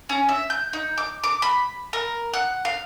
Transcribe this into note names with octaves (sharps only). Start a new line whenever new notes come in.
C#4
E5
G6
D#4
D6
D6
B5
A#4
F#5
F5